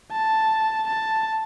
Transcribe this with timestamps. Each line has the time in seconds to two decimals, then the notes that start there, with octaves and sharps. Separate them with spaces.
0.12 A5
0.87 A5